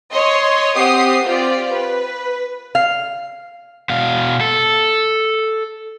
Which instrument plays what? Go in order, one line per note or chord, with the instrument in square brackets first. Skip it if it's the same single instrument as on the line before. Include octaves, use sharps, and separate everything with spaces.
[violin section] C#5 D#5 C6
C4 G4 F#5 D#6 C7
C4 F4 G4 D5
B4
[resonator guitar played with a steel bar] F5
[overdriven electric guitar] B2 F5
A4